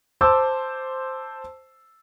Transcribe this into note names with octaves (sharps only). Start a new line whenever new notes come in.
C5 A5 D6 E6